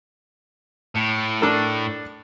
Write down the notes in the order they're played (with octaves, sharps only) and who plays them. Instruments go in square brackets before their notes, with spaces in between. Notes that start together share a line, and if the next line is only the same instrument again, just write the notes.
[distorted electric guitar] A2
[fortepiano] D4 A4 A#4